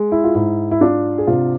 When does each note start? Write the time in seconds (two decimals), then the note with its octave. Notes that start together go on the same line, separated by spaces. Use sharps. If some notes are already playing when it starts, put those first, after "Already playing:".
Already playing: G#3
0.12 E4
0.24 F4
0.35 G#2 E4
0.71 E4
0.81 D4 F4
1.18 G#4
1.27 C3 F4